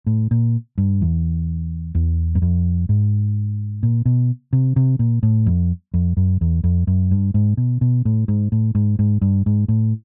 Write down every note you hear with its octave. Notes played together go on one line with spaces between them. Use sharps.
A2
A#2
G2
E2
E2
F#2
F2
G#2
A#2
B2
C3
C3
A#2
A2
F2
F2
F#2
E2
F2
F#2
G2
G#2
B2
B2
A2
G#2
A2
G#2
G#2
G2
G#2
A2